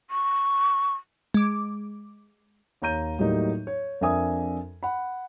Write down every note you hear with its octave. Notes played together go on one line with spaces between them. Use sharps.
C#6
G#3 D6
D#2 C#5 A#5 G6 D#7
A2 F#3 G3 A#3 D#4
C#5
F2 D4 A#4 E5 G#5 D#6
F#5 B5